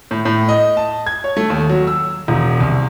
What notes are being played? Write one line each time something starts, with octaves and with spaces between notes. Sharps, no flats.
A2
A2
D#5
A5
G#6
C#5
A3
D#2
F#3
E6
E1
C2